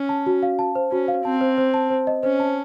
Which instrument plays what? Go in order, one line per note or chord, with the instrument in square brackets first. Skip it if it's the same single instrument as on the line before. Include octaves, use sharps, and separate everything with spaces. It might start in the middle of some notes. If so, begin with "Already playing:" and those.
Already playing: [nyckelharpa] C#4
[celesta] A5
F#4
F5
A5
C5
[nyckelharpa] C#4 [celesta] F#4
[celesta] F5
[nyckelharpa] C4 [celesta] A5
[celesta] C5
C5
A5
C5
D#5
[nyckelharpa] C#4 [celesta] C5
[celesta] A5